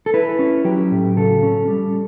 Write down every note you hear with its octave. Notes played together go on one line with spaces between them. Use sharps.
A4
E4 B4
C#4
F#3 G4
A2
C#3 A4
C#4
G3